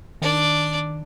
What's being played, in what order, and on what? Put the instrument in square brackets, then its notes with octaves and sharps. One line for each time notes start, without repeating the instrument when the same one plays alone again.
[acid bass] D#3 [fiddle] D4 D5